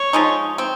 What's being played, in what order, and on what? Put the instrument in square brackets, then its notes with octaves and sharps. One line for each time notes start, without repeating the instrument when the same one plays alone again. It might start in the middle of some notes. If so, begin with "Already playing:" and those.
Already playing: [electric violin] C#5
[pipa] F3 G#3 D#4
C4